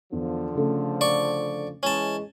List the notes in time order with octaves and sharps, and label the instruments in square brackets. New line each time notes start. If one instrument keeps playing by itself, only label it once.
[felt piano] E2 [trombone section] D3 F3
[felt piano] C#3 A3
[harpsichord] D5 C#6
[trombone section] E3 G#3 [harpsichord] C#4 A5